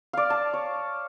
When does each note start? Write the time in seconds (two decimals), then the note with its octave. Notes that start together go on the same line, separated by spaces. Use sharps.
0.13 D5 F5
0.30 A5
0.53 C#5